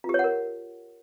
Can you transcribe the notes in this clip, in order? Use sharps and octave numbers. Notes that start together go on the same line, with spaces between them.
F4
G4
C#5
F#5
A#4